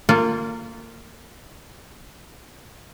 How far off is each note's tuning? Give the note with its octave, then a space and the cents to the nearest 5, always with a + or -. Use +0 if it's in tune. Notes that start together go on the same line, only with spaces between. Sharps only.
A#3 -25 F4 +0 A4 -15